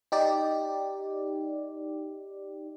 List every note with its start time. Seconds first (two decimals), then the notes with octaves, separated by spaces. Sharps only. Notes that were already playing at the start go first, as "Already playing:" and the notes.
0.12 D#4 G4 D5